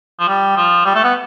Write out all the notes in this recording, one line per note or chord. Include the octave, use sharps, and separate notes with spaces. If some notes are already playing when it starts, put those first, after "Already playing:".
F3
G3
F3
G3
A3
B3